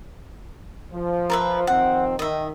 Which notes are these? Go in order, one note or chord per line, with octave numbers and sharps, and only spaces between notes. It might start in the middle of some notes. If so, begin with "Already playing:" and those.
F3
A#4 B4 E5
D#3 F3 C4 F#5
D#3 D#5 E5